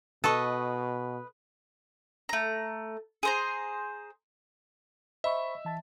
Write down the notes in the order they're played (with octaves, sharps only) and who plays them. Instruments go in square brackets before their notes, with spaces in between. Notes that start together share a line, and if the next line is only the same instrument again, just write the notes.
[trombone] B2 [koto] A4 [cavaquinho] B4 D#5 C#6
[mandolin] A3 A#5
G#4 C5 A#5
[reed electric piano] C5 B5 C#6 [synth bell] D#5 [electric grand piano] E5
[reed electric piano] E3 A5 A6